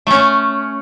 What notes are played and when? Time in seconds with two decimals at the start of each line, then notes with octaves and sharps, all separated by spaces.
0.07 A3 C#4